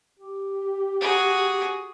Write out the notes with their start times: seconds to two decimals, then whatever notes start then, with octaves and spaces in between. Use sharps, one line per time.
0.19 G4
1.01 F#4 G#4